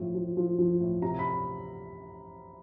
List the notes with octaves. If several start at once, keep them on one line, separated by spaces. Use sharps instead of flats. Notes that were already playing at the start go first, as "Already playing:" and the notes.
Already playing: A2 F3
F3
F3
F3
A2
C3 A#5
B5